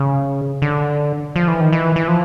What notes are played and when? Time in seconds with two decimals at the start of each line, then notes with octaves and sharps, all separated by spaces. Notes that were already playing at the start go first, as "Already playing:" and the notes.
Already playing: C#3
0.62 D3
1.36 F3
1.48 E3
1.60 D#3
1.73 E3
1.96 E3
2.08 F3